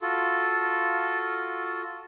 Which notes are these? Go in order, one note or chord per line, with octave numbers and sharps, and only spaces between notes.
F4 F#4 A4